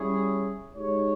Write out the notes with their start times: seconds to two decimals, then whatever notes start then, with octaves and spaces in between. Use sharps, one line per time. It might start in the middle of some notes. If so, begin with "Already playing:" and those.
Already playing: G3 C#4 E4 G#4 C#5
0.75 G#3 D#4 G4 C#5